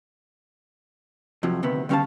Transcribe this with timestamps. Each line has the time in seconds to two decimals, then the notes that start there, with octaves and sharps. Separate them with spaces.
1.43 F2 C3 F3 F#3
1.63 D2 C3 D#3 B3
1.89 D3 G3 C#4 A#4 F5 A5